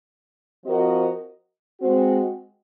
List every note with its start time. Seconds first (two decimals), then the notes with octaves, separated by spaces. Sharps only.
0.66 F3 C4 F#4 A#4 D#5
1.80 G#3 C4 F#4